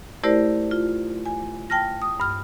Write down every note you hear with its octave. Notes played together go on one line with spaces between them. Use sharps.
A3 E4 G4 A#4 C5 D5
F4
G#5
G5 A5 F6 A#6
D#6
G2 F6